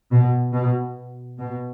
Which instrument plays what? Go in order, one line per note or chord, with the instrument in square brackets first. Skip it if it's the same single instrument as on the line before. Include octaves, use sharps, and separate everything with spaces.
[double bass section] B2
B2
B2